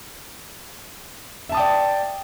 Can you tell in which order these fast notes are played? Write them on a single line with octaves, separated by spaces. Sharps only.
E5 A5 D#6 G5 D5